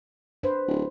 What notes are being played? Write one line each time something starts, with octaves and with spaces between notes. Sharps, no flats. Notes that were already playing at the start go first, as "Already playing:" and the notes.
D4 B4 C5
D1